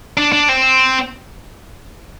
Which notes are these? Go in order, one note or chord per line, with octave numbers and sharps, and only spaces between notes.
D4
D4
C4